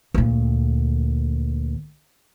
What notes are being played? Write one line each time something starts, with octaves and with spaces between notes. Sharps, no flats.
D2 A#2